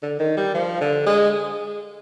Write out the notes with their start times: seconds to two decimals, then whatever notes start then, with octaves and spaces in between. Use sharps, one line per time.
0.02 D3
0.19 D#3
0.37 G3
0.55 F3
0.81 D3
1.06 G#3